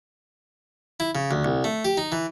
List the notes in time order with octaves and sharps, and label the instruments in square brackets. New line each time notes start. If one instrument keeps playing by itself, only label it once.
[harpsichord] E4
C#3
D2
C2
A3
G4
D#4
E3